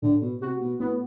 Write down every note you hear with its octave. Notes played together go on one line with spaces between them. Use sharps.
A2 D3
B2
C3 F#4
B2
A2 B3